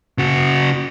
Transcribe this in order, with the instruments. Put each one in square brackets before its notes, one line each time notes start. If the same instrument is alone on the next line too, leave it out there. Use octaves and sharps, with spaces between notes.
[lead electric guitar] C#3 F#4